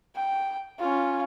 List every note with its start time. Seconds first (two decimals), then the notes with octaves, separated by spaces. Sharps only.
0.16 G5
0.79 C#4 F4